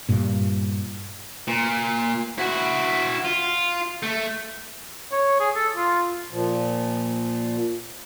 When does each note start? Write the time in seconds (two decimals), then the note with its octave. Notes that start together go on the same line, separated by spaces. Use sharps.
0.09 G2 A#2
1.48 A#2
2.38 E4 F#4
3.25 F4
4.03 A3
5.12 C#5
5.40 G#4
5.55 A4
5.76 F4
6.31 A#2 F3